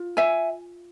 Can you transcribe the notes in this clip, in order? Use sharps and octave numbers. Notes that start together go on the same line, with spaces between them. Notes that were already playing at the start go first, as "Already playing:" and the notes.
Already playing: F4
E5 G#5